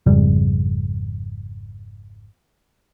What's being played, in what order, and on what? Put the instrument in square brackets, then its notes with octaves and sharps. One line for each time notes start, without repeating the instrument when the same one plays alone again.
[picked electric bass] G#1 F2 C#3 G3